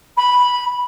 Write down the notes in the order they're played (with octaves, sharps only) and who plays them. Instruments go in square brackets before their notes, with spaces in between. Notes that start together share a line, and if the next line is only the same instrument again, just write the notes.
[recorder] B5